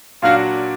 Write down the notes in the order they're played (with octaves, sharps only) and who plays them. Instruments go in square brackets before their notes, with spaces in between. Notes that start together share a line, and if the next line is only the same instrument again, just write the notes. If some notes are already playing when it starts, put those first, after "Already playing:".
[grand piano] A#2 F#3 D4 F#4 [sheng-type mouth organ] F5